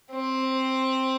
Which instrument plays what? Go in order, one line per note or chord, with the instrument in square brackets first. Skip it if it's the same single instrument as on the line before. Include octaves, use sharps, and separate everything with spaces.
[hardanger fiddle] C4